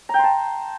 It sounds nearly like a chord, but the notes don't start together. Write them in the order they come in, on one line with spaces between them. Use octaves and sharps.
A#5 G5 C6 A5